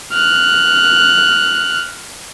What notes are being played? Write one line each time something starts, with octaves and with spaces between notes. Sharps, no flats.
F6 F#6